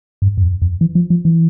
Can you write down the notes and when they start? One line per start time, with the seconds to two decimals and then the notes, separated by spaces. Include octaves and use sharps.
0.22 G2
0.38 G2
0.42 F2
0.62 F2
0.81 E3
0.95 F3
1.10 F3
1.25 E3